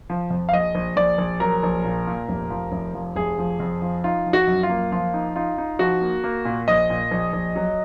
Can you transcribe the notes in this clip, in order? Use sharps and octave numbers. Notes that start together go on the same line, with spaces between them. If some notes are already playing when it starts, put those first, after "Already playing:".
F3
F2
F5
A#1 D#5
A#1
A#1 D5
A#1
F#3 A#4
A#1
A#2
A#2
F1
F3
F1
F3
F1 G#4
F3
F2
F3
D#4 F4
F3
F#4
F#2
F4
A#3
F3 F4
D#4
D#4 F4
D#4
F3 F#4
A#3
A#3
A#2
A#1 D#5
A#2
A#1
A#1
F#3